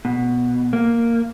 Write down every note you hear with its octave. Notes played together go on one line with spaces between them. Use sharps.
B2
A#3